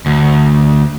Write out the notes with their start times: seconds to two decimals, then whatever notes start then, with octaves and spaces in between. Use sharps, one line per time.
0.06 D2